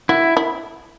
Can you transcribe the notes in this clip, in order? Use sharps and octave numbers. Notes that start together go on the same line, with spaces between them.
E4 F#4
E4